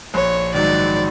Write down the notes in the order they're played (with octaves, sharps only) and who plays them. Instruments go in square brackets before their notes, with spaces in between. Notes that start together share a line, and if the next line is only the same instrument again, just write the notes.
[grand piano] A#1 [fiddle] C#5
[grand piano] G#2 D#3 F#3 [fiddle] D5